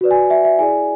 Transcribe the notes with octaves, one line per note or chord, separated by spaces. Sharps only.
F#4 B4 D5
G#5
E5
E5
E4 G#4 D5 G#5